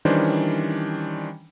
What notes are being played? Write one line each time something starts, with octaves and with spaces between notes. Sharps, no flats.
D#3 E3 G3 C#4 D4 C5